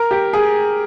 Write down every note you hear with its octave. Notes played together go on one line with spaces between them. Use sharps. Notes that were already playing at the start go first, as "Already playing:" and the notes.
Already playing: A#4
G4
G#4